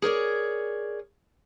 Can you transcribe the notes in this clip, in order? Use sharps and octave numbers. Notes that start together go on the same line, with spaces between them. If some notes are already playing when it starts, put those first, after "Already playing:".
G#4 A#4 C#5 D5